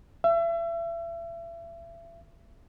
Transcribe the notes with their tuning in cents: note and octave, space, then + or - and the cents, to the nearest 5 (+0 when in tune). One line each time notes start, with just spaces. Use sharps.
E5 +35